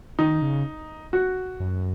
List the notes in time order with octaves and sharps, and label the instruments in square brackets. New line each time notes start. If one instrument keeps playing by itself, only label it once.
[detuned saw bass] D#3 [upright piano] D#4
[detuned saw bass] C#3
[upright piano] F#4
[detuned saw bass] F#2